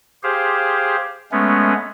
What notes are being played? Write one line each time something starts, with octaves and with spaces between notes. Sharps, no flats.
G4 G#4 C5 F5
G#3 A3 B3 C#4